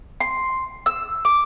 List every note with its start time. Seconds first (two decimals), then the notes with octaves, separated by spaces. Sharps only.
0.21 C6
0.86 E6
1.25 D6